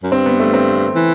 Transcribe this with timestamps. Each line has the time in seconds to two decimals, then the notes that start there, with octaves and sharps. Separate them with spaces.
0.03 F#2
0.12 G2 C4
0.26 B3
0.40 A3
0.54 C4
0.95 E3